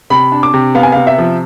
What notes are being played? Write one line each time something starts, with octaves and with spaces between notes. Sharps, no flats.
C3 B5
D4
D6
C3
B3 F5
G#5
C3 F5
E5
F3